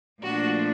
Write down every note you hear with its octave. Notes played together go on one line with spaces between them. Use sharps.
A#2 F3 A3 D4 F#4